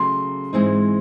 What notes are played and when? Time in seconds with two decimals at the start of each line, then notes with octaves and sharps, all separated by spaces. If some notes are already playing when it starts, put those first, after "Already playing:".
Already playing: C#3 F#3 A3 C6
0.53 G#2 E3 G#3 C4 D#4